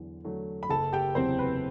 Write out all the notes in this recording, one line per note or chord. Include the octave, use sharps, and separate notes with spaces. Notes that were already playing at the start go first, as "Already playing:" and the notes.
Already playing: E2 D3 F#3
D3 F#3 A3
B5
F#1 A4 A5
G4 G5
E2 C3 F#3 C4 C5
B4